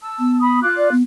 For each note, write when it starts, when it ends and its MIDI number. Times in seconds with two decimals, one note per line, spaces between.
0.02 0.37 81
0.02 0.37 88
0.19 0.61 59
0.40 0.59 83
0.40 0.59 87
0.62 0.91 65
0.62 0.91 86
0.62 0.91 90
0.77 0.90 74
0.91 1.02 59